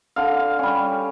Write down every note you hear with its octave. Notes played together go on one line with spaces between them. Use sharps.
D3 F5
G3 C#4